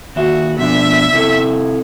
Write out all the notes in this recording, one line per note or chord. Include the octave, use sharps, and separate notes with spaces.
D#2 F#4 E5
B2 F3 D4 E5
C3 E4 A4